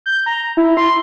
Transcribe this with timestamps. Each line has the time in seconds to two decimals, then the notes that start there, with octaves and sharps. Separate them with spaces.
0.06 G6
0.26 A#5
0.57 E4
0.77 C6